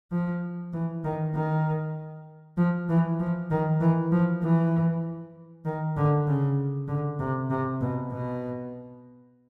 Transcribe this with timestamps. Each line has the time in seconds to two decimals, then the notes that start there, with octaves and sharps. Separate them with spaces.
0.11 F3
0.73 E3
1.04 D#3
1.35 D#3
2.57 F3
2.89 E3
3.20 F3
3.51 D#3
3.80 E3
4.12 F3
4.42 E3
5.65 D#3
5.97 D3
6.27 C#3
6.88 D3
7.20 C3
7.50 C3
7.81 B2
8.12 B2